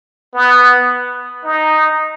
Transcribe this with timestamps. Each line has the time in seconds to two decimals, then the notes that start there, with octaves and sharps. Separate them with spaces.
0.34 B3
1.44 D#4